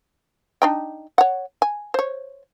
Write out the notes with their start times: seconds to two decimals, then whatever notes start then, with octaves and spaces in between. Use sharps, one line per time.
0.62 D4 D#4 G5
1.18 C#5 F#5
1.62 G#5
1.94 C5 C#5